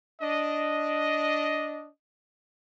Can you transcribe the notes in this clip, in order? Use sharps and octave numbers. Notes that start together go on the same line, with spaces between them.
D4 D#5